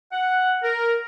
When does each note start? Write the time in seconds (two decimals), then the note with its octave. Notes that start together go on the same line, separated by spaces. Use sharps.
0.12 F#5
0.63 A#4